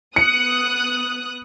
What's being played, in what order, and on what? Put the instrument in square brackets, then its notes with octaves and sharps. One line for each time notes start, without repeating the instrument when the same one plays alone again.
[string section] B3 D#6 F#6 [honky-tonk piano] C#7